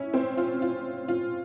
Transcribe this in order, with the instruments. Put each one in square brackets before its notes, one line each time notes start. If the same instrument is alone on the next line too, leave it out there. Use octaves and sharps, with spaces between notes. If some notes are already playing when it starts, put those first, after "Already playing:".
Already playing: [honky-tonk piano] C#4 E4
C4
F4
F4
F4